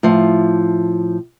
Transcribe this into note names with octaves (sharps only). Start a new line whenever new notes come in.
A2 F3